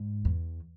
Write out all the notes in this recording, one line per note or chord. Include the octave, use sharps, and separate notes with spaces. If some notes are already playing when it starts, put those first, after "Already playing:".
Already playing: G#2
E2